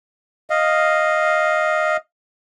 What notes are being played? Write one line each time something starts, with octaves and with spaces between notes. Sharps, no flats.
D#5 F5